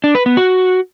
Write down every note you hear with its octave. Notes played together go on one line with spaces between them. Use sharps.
D4
B4
B3
F#4